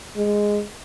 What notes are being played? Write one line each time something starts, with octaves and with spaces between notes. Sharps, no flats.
G#3